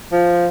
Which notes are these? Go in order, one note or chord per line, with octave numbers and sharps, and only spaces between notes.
F3